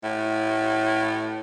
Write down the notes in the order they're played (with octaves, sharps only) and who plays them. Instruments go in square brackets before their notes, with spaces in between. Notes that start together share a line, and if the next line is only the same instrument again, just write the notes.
[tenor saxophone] A2